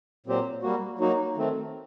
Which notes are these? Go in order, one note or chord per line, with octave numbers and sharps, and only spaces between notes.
A#2 F#3 C4 G4 C5
G3 A#3 F#4
F#3 A#3 D#4 F#4
D#3 A3 C4